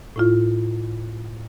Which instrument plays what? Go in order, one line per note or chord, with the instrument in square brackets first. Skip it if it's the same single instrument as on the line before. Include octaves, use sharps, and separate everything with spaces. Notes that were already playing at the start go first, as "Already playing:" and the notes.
[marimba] A2 E4 F4